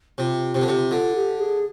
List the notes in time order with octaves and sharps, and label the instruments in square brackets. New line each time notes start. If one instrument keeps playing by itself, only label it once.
[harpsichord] C3 [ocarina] F4
[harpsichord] C3
D3
C3
[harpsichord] D3 [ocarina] F4
[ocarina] G4
G#4